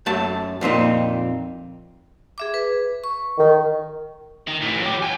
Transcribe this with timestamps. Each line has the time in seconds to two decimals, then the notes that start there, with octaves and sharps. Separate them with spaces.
0.06 F#2 A3 A5
0.61 F2 A#2 C4 D#4
2.38 G#4 E5 D6
2.54 B4
3.04 C#6
3.37 D#3
4.47 D#3
4.62 A2 E3
4.81 F#3 G4
5.02 G5 G#5